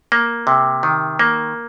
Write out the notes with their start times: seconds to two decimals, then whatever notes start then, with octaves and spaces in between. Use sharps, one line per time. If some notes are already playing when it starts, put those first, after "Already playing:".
0.12 A#3
0.47 C3
0.83 D#3
1.19 A#3